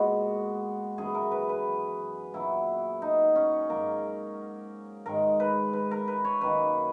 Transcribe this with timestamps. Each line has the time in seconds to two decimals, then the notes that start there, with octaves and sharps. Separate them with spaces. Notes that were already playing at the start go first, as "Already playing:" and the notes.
Already playing: A#2 G#3 B3 F#4
0.98 F#2 E3 B3 G#4
1.15 A#4
1.31 B4
1.49 B4
2.34 A#2 F#3 B3 E4
3.02 D#4
3.35 C#4
3.69 G#2 F#3 A#3 A#4
5.06 G#2 D#3 G#3 A#4
5.40 B4
5.73 B4
5.91 A#4
6.08 B4
6.25 C#5
6.41 F#2 D#3 A#3 B4